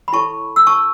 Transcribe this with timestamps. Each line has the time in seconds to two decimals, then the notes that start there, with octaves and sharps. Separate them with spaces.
0.08 B5
0.13 E4 A4 C#5 A5 C#6
0.56 E6
0.67 A5 C#6